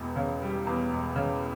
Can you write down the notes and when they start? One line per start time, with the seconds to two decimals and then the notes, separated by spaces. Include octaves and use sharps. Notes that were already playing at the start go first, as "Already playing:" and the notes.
Already playing: E1 E2
0.16 C#3
0.42 G3
0.67 E2
0.90 E1
1.16 C#3